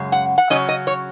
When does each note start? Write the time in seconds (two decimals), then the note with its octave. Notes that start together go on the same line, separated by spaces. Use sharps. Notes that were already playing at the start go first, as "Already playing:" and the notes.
Already playing: F#2 C#3 G#3
0.12 F#5
0.38 F#5
0.50 C#3 F#3 C#4 D#5
0.69 D#5
0.87 C#5